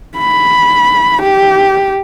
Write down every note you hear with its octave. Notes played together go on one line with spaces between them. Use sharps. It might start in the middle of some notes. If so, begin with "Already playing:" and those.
B5
G4